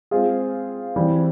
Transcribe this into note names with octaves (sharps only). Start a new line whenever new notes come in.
G#3 C4 F4 G#4
E3 G3 C4